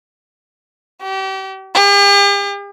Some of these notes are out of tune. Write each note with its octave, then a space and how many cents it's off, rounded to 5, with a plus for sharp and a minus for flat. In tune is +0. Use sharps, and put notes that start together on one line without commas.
G4 -35
G4 +45